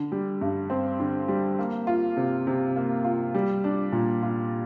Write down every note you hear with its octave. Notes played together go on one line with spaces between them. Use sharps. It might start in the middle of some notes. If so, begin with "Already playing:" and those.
Already playing: D3
G3
G2
C4
D3
G3
A#3
F4
C3
C3
A#3
F4
G3
D4
A#2
F4